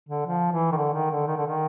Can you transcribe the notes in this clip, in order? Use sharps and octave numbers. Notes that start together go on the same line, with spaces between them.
D3
F3
E3
D#3
D3
D#3
D3
D#3
D3
D#3